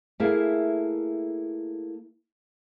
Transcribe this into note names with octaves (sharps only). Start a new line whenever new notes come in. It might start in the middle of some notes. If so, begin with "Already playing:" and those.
A3 A#3 E4 G#4 E5 F5